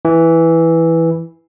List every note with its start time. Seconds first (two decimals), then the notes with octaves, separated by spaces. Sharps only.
0.05 E3